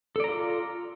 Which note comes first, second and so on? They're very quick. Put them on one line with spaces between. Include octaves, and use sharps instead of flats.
A4 D5 A#5 F4